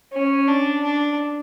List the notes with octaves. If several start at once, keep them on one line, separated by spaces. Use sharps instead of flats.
C#4
D4
D4